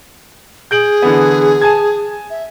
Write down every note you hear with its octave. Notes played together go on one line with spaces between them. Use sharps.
G#4 G6 D7 F#7
D3 E3 B3
G#5 A5 G#6
E5